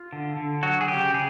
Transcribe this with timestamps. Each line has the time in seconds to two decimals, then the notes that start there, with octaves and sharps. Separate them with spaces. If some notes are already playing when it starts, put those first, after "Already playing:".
Already playing: F4
0.13 D3
0.37 D3
0.63 F#3 F#4
0.81 G#4
0.88 C#3 G4
1.14 C#3 G#4